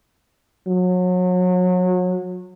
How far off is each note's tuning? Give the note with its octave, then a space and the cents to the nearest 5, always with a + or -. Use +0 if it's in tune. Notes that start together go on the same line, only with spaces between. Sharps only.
F#3 -30